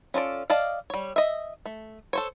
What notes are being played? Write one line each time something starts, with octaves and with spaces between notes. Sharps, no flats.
C#4 F4 A4 D5
D5 D#5 F5 A5
G3 C#5
D#5 E5
A3
A4 C5 C#5